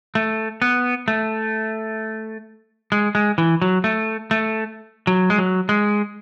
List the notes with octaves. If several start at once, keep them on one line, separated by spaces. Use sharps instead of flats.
A3
B3
A3
G#3
G#3
E3
F#3
A3
A3
F#3
G#3
F#3
G#3